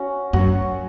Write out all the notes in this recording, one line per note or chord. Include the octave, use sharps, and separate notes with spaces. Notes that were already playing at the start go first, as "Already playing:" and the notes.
Already playing: C#4 F#4
F#2 F#4 C#5